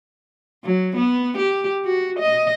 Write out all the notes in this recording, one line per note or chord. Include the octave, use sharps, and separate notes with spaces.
F#3
B3
G4
F#4
D#5